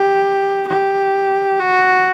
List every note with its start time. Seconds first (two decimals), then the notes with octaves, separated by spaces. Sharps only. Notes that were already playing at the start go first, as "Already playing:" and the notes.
Already playing: G4
0.68 G4
1.60 F#4